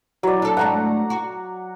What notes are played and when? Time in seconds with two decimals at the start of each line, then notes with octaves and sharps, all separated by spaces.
0.23 F#3 E4 D5
0.42 D4 A4
0.57 G#2 A3 D4 F#5 A#5
1.10 F#4